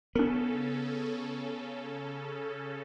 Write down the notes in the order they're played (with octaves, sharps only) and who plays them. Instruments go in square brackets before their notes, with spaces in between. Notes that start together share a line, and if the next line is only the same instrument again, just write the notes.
[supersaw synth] C#3 C#4 A4 [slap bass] B3 [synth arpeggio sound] D4 A#4